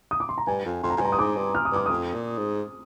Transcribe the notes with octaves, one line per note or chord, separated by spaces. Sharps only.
D#6
D6
C6
A#5
G2 G#5
F2
F2 C6
A#5
F2 G#5
G2 A#5
D#6
G#2 D6
G2
F6
D#6
G2 D6
F2 D#6
A#2
G#2